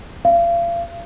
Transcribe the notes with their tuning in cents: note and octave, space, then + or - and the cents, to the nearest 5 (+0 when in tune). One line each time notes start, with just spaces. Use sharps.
F5 -35